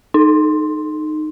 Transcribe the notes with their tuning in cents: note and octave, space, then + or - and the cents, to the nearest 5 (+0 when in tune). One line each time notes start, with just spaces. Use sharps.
D#4 -15